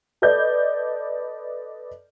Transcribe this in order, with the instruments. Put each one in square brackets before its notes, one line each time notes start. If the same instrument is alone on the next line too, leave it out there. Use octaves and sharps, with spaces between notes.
[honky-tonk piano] A4 B4 D5 D#5 G6